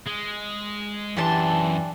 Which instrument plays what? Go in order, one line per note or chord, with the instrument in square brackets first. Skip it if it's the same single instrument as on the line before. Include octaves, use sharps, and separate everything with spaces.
[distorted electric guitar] G#3
[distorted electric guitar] F#2 C6 [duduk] E3 [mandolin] D4 G4 A5